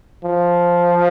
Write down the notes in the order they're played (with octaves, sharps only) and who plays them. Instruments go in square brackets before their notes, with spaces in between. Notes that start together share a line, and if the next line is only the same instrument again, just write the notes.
[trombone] F3